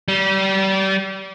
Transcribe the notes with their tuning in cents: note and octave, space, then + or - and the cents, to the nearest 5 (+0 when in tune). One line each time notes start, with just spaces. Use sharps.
G3 -30